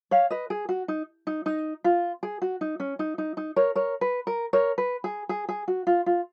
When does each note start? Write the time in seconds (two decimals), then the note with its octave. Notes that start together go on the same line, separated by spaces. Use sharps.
0.11 C#5 F5
0.30 B4 D#5
0.50 G#4
0.69 F#4
0.88 D#4
1.27 D#4
1.46 D#4
1.84 F4
2.23 G#4
2.42 F#4
2.61 D#4
2.80 C#4
2.99 D#4
3.18 D#4
3.37 D#4
3.56 A#4 C#5
3.75 A#4 C#5
4.01 B4
4.27 A#4
4.53 A#4 C#5
4.78 B4
5.04 G#4
5.29 G#4
5.49 G#4
5.68 F#4
5.87 F4
6.06 F4